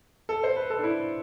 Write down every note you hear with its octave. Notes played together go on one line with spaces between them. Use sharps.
A4
C5
B4
A4
D4
E4